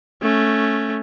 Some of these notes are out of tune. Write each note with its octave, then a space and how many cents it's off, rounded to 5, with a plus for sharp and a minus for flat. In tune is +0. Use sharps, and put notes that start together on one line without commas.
A3 +0 C#4 +0